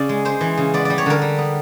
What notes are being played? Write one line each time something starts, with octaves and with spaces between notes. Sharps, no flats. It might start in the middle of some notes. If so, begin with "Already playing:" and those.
Already playing: C#3 D5
G#3
G#3 C5
E3
C#3
B3 D5
G3 D5
C#5
D3 A#4
G3
B3